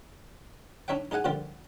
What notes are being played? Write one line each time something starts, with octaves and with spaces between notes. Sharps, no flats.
D4 D#4 C#5 E5 G5
D#4 G#4 D#5 F#5 G#5
A#2 D3 F3 G3 F4 G4